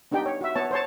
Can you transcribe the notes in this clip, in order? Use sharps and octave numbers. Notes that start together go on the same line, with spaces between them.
B3 D4 D#4 G4 G5
C#5
F#4 E5
B3 C#5 A5
C5 C#5 A5